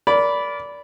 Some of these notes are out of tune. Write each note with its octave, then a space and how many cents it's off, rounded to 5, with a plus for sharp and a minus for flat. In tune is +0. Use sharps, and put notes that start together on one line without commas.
A#4 +10 D5 -20 B5 +0